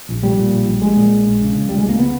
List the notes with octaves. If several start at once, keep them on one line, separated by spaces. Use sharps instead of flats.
A#1
A#2 G3
A#2
A#1
A#1
A#2 G#3
A#2
A#1
A#1
C#3
C#3
C#2 G3
G#3
C#2 A#3
C#3 B3